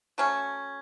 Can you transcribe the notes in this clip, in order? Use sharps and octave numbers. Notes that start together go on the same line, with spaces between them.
F#3 A3 C#4